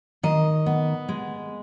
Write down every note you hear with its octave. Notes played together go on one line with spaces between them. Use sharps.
D#3 D#5
B3
G#3